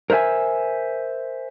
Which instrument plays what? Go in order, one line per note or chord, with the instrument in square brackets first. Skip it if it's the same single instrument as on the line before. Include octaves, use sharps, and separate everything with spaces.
[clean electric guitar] A#4 C5 C#5 E5 G#5